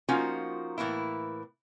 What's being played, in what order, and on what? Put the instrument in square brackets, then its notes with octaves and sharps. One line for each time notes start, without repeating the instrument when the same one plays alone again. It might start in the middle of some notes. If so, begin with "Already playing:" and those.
[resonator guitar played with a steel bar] F3 A#3 C#4 D#4 F4 F#4
A2 E3 A#3 E4